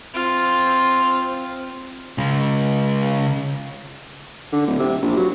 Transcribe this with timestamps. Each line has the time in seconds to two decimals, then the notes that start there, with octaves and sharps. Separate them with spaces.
0.14 C4 F4
2.18 C#3 G#3
4.52 D3
4.66 D1
4.79 C3
5.02 A#1
5.16 F#3